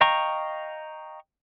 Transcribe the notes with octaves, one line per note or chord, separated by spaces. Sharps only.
D#5 F5 G5 A#5 C#6